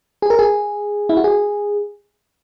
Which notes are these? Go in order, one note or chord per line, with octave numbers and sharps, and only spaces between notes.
G#4
A#4
G#4
E4
F#4
G#4